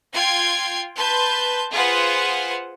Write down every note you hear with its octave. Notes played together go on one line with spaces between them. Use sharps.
F4 G5 G#6 C7
B4 A5 C6 G6
F4 G#4 B4 C5 F#5